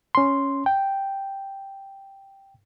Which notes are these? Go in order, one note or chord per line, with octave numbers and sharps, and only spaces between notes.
C#4 C6
G5